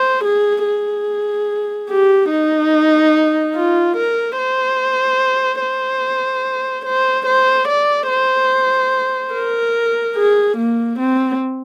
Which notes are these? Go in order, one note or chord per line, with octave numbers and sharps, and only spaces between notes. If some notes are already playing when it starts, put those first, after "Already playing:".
Already playing: C5
G#4
G#4
G4
D#4
F4
A#4
C5
C5
C5
C5
D5
C5
A#4
G#4
A#3
C4